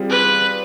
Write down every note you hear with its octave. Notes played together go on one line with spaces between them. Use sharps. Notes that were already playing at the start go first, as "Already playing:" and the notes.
Already playing: G3 C4 F4 G#4
B4